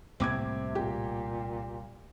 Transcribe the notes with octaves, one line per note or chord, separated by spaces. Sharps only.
C2 A2 C3 A#3 C4 D6 G#6
A#2 G4